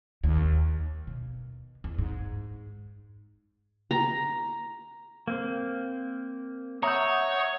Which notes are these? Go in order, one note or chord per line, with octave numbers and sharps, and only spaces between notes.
D#2
B2
E2
G#2
A#5
A#3 C4
C#5 E5 F#5 A#5 D#6 E6 G6